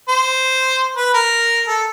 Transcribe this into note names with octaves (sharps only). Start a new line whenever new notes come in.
C5
B4
A#4
A4